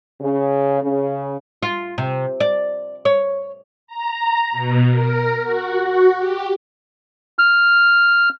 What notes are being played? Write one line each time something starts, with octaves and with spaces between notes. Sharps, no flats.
C#3
C#3
F4
C3
D5
C#5
A#5
B2
A#4
F#4
F#4
G4
F6